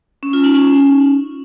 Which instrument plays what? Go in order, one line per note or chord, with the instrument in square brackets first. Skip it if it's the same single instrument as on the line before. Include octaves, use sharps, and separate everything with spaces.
[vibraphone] C#4
F4
D#4
C#4